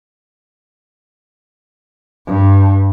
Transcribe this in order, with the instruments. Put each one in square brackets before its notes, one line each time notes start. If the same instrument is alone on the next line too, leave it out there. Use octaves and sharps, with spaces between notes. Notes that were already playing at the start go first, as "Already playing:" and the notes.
[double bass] G2